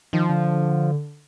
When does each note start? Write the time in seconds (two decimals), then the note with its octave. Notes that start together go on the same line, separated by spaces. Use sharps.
0.13 D#3 F3
0.29 D3